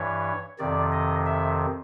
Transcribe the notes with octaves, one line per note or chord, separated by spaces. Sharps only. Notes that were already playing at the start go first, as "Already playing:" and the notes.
Already playing: G2 E3 C#5
F2 C3 D#3 D5
D#5
E5